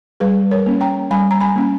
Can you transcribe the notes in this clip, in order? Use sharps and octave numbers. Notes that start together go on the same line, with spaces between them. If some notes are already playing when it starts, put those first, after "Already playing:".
G3 G#4 B4
A#4 C#5
A#3 C#4
G5 A#5
G3 G#5 B5
A#5
G#5 B5
A#3 C#4